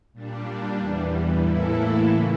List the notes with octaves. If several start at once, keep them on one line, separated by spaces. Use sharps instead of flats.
A#2 G3 D4
E2 E3 G3
A2 E3 A#3 E4 A4
C#3 E3 A3